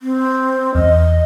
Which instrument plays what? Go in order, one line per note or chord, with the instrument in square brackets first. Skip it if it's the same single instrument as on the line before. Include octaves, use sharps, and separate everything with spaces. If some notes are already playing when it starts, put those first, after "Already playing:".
[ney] C4
[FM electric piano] E2 [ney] D#5